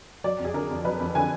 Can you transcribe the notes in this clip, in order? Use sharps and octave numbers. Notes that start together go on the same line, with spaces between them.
F#3 D5
F2
G#4
D3 A#4
F2
F#3 B4
F2
D3 G#5